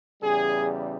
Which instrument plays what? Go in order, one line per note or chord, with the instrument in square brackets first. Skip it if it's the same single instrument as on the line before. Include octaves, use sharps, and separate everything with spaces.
[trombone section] E2 C#3 G3 G#4